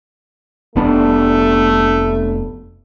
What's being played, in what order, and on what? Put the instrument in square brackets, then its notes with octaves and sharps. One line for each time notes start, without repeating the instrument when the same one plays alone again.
[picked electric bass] F1 B3 D4 [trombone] A3